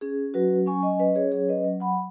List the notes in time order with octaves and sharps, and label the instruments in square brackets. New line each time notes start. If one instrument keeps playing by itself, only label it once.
[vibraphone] C#4 G#4
F#3 F#4 B4
C#4 G#5 C#6
D#5 G#5
C#4 B4 D#5
G#4 C#5
F#3 G#4 C#5
B4 D#5
F#3
F#5 B5